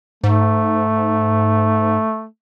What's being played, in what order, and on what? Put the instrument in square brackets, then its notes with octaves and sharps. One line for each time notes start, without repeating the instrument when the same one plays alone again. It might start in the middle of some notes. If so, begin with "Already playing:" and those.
[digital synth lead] G#2 [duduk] A3